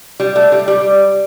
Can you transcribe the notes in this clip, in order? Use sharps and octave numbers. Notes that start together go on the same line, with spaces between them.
G3
A3
G3
G3